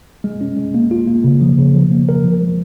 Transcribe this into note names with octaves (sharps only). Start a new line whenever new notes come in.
G#3
C#4
G#3
A#3
F4
A#3
C#3
F3
C#3
F3
A#3
A#4
F3
G#3